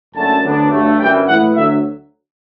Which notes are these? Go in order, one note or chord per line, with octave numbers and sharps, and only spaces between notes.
F#1 F#2 D3 A3 C#4 A5
D2 D3 F#3 B3 D4
G2 F#3 A3
G1 F#2 E3 G3 G5
A2 E3 B3 E4 F#5
D2 D3 F#3 E5